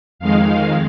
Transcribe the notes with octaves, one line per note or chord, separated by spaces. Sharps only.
F2 D#3 G#3 F5